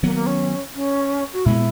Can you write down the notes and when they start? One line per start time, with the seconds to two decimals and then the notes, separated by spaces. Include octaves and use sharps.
0.03 D#3 F#3 A#3 B3
0.15 A#3
0.27 C#4
0.74 C#4
1.33 F#4
1.46 A#2 G#3 B3 E4